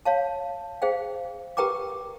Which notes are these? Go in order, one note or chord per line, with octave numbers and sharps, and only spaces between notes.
C#5 F5 A5
G#4 C5 F5 G5
G4 A#4 B4 G5 A#5 D6